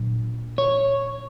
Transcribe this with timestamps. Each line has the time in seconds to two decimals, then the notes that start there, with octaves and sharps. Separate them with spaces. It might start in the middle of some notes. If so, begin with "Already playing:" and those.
Already playing: A#2 F#3 D4
0.58 C#5